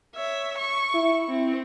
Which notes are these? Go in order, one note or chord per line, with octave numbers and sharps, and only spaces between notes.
C#5 E5
C#6
E4
C4